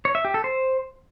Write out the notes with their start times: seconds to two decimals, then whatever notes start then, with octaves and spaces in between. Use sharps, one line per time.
0.05 C#5
0.15 E5
0.25 G4
0.34 A4
0.44 C5